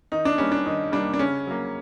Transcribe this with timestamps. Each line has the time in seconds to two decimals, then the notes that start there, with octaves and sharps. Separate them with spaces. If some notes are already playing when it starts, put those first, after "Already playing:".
0.12 D#3 D#4
0.25 D4
0.38 G3 A#3 C#4
0.52 D4
0.66 D#3 D#4
0.92 G3 A#3 D4
1.14 D4
1.19 C#3 C#4
1.47 F#3 A#3